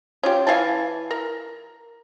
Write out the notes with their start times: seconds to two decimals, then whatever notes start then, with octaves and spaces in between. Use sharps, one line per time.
0.23 C#4 F4 G4
0.47 E3 F5 G#5 A5
1.11 A#4